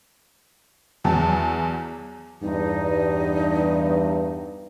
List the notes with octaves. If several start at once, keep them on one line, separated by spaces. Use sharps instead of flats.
E2 F#3 A5
E2 G2 D#4